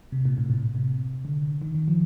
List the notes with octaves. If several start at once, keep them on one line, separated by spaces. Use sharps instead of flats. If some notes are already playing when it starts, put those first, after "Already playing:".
C3
A#2
A2
A#2
C3
D3
D#3
D#3
F3